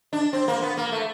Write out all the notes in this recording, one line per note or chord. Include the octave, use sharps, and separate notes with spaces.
D4
C4
A#3
B3
A#3
A3